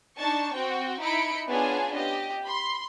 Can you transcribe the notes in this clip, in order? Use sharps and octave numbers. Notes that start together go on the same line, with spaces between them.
D4 D#4 A5 C#6
C4 F#4 G5
D#4 E4 B5 C#7 D7
B3 C#4 D4 F4 G#4 G#5
G4 D#5
B5 C6